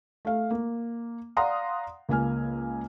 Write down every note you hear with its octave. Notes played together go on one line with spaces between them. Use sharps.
A3 F5
A#3
D5 F5 F#5 A#5 C6 D#6
C#2 A#3 G#5 F6